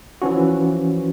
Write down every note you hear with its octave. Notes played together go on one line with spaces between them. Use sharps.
E3 F3 C#4 F#4